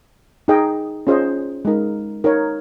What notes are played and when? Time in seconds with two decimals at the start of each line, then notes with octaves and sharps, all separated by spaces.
0.48 D#4 G#4 D#5 G5
1.07 C#4 F4 G#4 C5 D#5
1.65 G#3 D#4 A#4
2.24 D#4 A#4 C#5